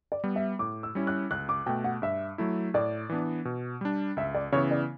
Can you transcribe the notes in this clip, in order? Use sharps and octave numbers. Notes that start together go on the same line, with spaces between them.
D5
G3 B3
E5
A2 D6
E6
G3 C#4 E4
F#6
C#2 F#6
D6
B2 A3 G5
F#5
G2 E5
F#3 A3 E4
A2 D5
E3 B3 D4
B2
G3 D4
C#2 E5
D5
C#3 E3 B3 E4 C#5
D5